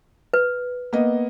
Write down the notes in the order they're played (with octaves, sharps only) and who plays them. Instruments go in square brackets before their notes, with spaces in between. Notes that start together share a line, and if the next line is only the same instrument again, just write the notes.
[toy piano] B4
[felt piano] A#3 B3 D#5